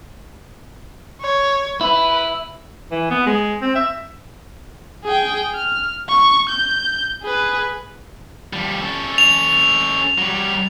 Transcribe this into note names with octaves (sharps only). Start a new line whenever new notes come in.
C#5
E4 B4
E3
B3
G#3
C4
E5
G#4 G5
F6
C#6
G6
G#4 B4
F3 G3
C#4 A4
F7
F#3 G3